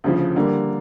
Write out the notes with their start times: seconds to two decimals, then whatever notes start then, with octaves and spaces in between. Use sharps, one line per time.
0.04 D2 C#3 F3
0.36 D3 G3 A#3